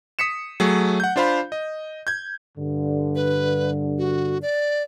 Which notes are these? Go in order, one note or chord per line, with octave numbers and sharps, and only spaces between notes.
D#6 B6 C#7 E7
F#3 A3 G#4
F#5 G6
D4 F4 C5 F5 B5
D#5
G6 G#6
G2 D3
B4
F#4
D5